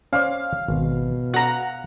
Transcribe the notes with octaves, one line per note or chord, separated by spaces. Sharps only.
C#4 C5 D5 F5
G#1 B2
F#4 F#5 A#5